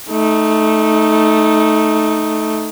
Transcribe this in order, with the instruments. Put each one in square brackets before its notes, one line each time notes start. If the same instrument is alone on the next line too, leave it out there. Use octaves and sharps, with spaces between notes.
[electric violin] A3 D#4